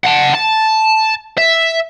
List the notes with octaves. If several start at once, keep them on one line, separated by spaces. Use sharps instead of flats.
F#5 A5
A5
E5